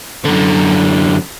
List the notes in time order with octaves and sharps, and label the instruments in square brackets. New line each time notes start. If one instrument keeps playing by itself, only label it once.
[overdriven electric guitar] F#2 D3